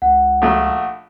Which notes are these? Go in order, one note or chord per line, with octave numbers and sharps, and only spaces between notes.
C#2 F#5
A#1 A3